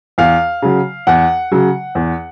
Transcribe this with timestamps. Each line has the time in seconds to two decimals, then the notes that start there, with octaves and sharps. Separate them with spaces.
0.18 E2 F5
0.62 C#3 F#3
1.07 E2 F#5
1.52 C#3 F#3
1.95 E2